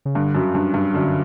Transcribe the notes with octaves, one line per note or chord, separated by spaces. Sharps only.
C#3
G2 D3
F#2
G2
G2
F#2 D3